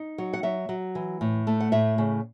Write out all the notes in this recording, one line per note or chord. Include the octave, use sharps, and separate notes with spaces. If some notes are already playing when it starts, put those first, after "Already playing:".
Already playing: D#4
F#3
F#5
F#3 E5
F#3
E3
A2
A3
F#5
A2 E5
C#3